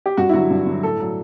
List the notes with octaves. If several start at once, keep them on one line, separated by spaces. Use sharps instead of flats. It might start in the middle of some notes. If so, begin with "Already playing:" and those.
G4
G2 F#4
E4
D3 F#3 F#4
G2
D3
F#3
A2 A4
F#3